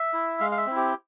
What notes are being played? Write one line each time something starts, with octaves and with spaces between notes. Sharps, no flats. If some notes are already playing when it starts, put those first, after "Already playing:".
Already playing: E5
E4
G#3 F5
F5
E5
C4 E4
G4